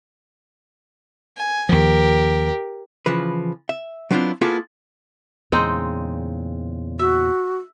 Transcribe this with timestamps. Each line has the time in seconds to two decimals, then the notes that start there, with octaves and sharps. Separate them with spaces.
1.37 G#5
1.69 D#2 F3 G4 A#4
3.06 C#3 E3 F3 B4
3.69 E5
4.11 F#3 B3 C4 D4 E4 F4
4.41 A#3 B3 E4 F4 G#4 A4
5.52 E2 A#2 C#3 G#3 C4 D#4
6.99 F#4 E5